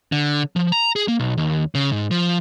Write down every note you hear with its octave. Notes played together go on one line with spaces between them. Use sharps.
D3
F3
A#5
G#4
A#3
B1
D#2
C#3
G#2
F3